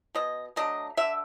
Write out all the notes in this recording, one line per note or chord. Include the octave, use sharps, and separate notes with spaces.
B2 D#5
F#3 A3 D4 D#5
D3 E5